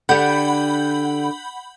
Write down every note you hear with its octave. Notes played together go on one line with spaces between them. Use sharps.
D3 G4 F#5 B5 G6